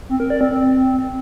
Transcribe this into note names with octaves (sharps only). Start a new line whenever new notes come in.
C4
A#4
D5
C4
C4